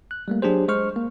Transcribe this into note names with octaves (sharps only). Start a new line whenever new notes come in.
F#6
G3 A3 A#3
F#3 D4 G4 G#4 C5
G#3 C5 C#6 F6
A#3